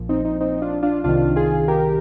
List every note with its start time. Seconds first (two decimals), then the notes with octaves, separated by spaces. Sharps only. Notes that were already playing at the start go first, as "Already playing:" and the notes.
Already playing: A#1 A#2 F3
0.09 C4 D#4
0.24 C4 D#4
0.40 C4 D#4
0.62 D4 F4
0.82 D4 F4
1.04 C2 C3 D#3 D4 F4
1.36 F4 G#4
1.68 G4 A#4